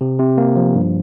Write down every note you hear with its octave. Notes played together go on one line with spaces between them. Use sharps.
C3
C3
A#3
F3
G2